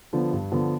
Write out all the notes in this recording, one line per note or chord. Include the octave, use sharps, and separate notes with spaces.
D3 F3 B3
G2
D3 F3 B3